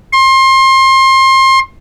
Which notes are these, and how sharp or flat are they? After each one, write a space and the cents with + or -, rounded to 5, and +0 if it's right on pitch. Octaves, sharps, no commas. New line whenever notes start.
C6 +30